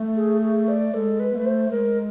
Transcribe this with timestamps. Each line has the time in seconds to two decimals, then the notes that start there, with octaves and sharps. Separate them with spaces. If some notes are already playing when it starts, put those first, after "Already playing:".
Already playing: A3
0.16 G#4
0.42 G#4
0.68 D5
0.93 G#3 A4
1.20 B4
1.33 B3
1.36 A3 B4
1.45 C5
1.70 G#3 A#4